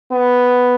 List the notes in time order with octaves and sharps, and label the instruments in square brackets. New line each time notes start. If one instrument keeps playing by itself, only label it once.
[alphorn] B3